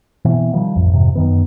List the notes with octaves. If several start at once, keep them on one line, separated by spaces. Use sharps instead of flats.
B2 E3 C4
D#3 F3 G3
A1 F2
F2 G#2 C3
F#2 D#3 B3